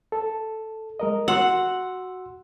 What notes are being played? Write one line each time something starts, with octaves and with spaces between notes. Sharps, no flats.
A4
G#3 A#4 D#5
F#4 F#5 C6 E6